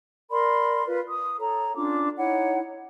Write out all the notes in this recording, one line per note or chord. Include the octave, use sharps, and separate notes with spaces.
A#4 D5 B5 C6
F4 B4
D#6
A4 C#5 A#5
C#4 D4 F4 D6
D#4 E4 C#5 F#5